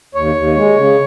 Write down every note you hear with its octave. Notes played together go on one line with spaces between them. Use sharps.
D#2 C#5
D#2
G#3
C#3